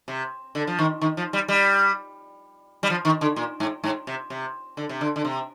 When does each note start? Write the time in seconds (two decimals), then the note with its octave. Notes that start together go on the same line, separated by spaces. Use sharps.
0.08 C3
0.55 D3
0.67 F3
0.79 D#3
1.01 D#3
1.17 F3
1.33 G3
1.48 G3
2.83 G3
2.90 F3
3.05 D#3
3.21 D3
3.36 A#2
3.60 G#2
3.84 G#2
4.07 C3
4.30 C3
4.77 D3
4.89 C3
5.01 D3
5.16 D3
5.25 C3